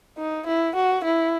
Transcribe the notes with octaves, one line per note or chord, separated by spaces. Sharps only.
D#4
E4
F#4
E4